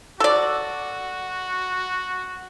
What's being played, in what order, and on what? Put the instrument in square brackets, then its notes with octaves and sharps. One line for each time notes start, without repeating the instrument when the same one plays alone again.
[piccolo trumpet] F#4 [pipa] A4 D5